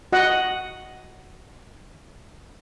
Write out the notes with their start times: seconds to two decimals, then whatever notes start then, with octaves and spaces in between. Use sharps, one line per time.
0.12 F#4 D#5 F#5